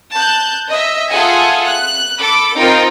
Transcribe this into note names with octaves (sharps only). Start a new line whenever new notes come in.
A5 F#6 G6
D#5 E5
F4 G#4 A4 E5 F#5 G#5
F#6
A4 B5 D6
C4 D#4 F4 A#4 G5